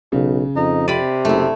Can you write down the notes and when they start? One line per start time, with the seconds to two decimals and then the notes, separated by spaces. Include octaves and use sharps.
0.12 B1 C#3
0.56 F2 D#4
0.88 C3 D5 B5 D#7
1.25 F#1 A3 E4